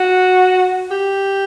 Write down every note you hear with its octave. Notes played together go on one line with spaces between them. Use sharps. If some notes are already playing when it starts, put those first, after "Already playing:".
Already playing: F#4
G4